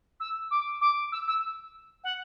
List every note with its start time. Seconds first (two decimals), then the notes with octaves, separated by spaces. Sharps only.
0.20 E6
0.51 D6
0.81 D6
1.12 E6
1.28 E6
2.04 F#5